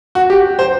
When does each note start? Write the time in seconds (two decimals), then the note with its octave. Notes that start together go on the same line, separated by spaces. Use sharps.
0.15 F#4
0.30 G4
0.59 C5